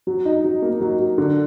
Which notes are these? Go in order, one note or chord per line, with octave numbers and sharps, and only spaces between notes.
F#3
D#4
F#3
A#3
F#3
F#3
D3